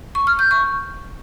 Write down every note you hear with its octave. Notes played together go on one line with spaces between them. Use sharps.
C#6
F6
G6
C#6